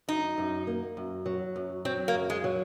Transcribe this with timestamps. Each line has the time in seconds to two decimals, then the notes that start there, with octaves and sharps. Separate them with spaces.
0.08 F#2 D#4
0.38 F#2
0.67 A#3
0.97 F#2
1.26 F#3
1.56 F#2
1.85 F#3 C4
2.08 A#3
2.14 F#2
2.30 G#3
2.44 F#3